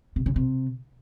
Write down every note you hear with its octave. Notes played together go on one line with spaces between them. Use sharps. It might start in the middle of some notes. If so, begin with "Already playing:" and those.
C3
C#3
C3